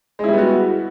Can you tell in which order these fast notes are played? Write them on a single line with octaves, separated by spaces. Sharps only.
G#3 E4 G3 B3 F#4